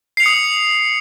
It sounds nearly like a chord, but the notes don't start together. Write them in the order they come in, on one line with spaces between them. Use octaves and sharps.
C7 F7 C#7 D#6